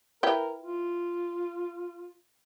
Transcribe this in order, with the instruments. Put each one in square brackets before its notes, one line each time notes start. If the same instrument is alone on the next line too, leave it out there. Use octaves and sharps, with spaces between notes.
[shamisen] E4 B4 G5 [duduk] A#4
[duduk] F4